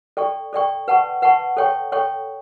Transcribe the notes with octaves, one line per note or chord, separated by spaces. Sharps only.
A4 D5 G5 C#6
A4 D5 G5 C#6
B4 F#5 A5 C#6
B4 F#5 A5 C#6
A4 C#5 G5 C#6
A4 C#5 G5 C#6